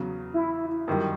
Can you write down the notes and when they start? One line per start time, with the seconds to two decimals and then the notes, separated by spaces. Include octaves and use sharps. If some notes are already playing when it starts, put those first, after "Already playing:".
Already playing: E2 C#3 F#3
0.34 E4
0.88 F#2 D#3 G3